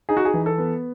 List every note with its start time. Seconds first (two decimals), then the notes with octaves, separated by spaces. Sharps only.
0.09 D#4 G#4
0.17 F#4
0.25 G#4
0.34 E3
0.46 A4
0.58 B3